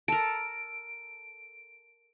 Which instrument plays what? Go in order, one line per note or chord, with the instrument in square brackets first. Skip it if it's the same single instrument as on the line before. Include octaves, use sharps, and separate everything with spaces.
[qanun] A4 A#4 [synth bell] D7